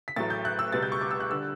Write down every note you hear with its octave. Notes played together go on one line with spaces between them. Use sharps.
B6
A1 A2 F#3 A3 A6
G6
F#6
E6
C#2 B2 G3 A6
G6
C#6
D6
E6
F#6
D3 G3 E6